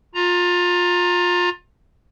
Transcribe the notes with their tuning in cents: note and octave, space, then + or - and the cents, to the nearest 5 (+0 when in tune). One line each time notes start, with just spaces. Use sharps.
F4 +25 A#5 +0